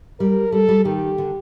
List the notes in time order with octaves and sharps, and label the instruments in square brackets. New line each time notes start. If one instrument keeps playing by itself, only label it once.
[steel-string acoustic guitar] G3 [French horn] A#4
[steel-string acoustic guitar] G3 [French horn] A4
[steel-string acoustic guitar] G3
[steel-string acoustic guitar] D#3 [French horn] G4
[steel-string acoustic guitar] D3